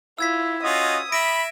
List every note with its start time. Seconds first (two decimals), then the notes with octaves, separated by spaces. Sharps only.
0.18 E4 F4 E6 G#6 B6
0.63 C#4 F4 F#4 D#5 D#6
1.12 E5 B5 A#6 D7